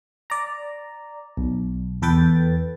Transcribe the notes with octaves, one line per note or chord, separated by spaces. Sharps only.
D5 A#5
B1
E2 A4 B4 G5 A6